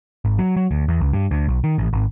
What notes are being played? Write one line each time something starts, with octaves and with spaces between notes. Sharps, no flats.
G#1
F#3
F#3
D2
E2
C#2
G2
D2
B1
D#3
A1
G#1